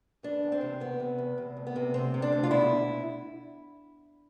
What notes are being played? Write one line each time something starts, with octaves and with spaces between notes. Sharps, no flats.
E3 D4
E2
C4
C3
E2 B3
C3
E2
C3
D2
B3
C3
D2 C4
C3
D4
D2
F4
B2 E4